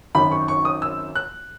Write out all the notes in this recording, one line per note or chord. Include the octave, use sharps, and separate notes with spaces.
G#1 F#2 D#3 B5
C#6
C#6
D#6
E6
F#6